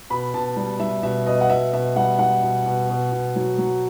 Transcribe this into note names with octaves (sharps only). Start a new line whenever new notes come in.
B2 B5
B2 A5
G3
G3 E5
B2 E5
B2 D#5
F#5
B2 E5
B2 E5
G3 F#5
G3 F#5
B2
B2
B2
B2
F#3
F#3